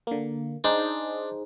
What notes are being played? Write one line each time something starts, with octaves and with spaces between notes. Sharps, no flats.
D3 A#3
D4 D#4 G#4 C5